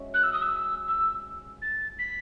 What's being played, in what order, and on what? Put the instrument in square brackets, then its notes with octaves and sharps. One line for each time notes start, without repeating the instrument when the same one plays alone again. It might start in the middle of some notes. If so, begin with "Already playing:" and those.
Already playing: [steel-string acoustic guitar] G#3 C#4 F#4 E5
[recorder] F#6
E6
D#6
E6
E6
A6
B6